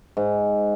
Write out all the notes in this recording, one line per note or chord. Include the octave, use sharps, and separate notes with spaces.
G#2